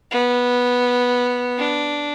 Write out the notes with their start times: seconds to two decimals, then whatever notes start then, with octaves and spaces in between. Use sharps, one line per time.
0.11 B3
1.59 D4